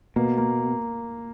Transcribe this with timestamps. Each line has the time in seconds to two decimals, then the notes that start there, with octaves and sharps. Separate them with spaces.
0.16 B2 A#3
0.38 A#3